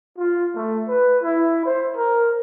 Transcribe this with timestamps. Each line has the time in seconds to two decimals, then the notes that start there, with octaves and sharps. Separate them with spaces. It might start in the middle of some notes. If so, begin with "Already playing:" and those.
0.18 F4
0.55 A3
0.88 B4
1.23 E4
1.66 C5
1.96 A#4